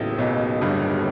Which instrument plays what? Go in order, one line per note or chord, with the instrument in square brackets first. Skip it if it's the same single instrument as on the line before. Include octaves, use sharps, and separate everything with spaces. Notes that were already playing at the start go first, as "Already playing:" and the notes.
Already playing: [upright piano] A1 A2 [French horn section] D#2 C#3 F#3 B3
[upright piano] B1 B2
G1 G2